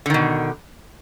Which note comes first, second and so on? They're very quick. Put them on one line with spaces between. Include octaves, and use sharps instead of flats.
D3 D#3 B2